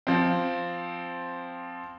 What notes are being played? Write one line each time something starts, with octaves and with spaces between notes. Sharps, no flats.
F3 C4